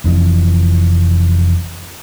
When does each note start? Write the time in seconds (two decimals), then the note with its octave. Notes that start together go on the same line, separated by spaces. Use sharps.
0.04 F1 F2 E3